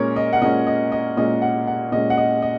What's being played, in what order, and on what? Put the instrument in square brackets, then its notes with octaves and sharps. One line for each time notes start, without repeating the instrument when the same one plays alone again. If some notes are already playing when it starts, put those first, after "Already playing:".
Already playing: [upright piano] A#2 G#3 C#4 A#4 C#5
D#5
F#5
A#2 G#3 C#4 D#5
D#5
D#5
A#2 G#3 C#4 D#5
F#5
F#5
A#2 G#3 C#4 D#5
F#5
D#5
D#5